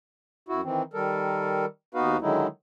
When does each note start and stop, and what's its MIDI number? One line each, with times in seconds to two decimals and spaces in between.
0.49 0.61 42
0.49 0.61 64
0.49 0.61 66
0.64 0.82 51
0.64 0.82 52
0.64 0.82 60
0.94 1.65 51
0.94 1.65 55
0.94 1.65 69
0.94 1.65 70
1.95 2.17 39
1.95 2.17 59
1.95 2.17 63
1.95 2.17 66
1.95 2.17 71
1.95 2.17 77
2.21 2.47 50
2.21 2.47 51
2.21 2.47 54
2.21 2.47 56
2.21 2.47 63
2.21 2.47 64